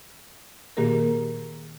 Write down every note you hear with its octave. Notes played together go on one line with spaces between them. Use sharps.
A#2 D#3 A#3 G4 G#4 A#4